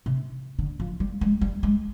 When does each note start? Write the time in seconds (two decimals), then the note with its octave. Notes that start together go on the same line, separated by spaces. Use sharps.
0.06 C3
0.59 D3
0.80 F3
1.00 G3
1.21 G#3
1.41 G3
1.63 G#3